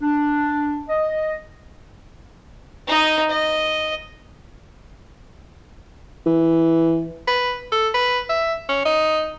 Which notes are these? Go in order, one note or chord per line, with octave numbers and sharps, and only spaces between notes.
D4
D#5
D#4 D#5
D#5
E3
B4
A4
B4
E5
C#4
D#4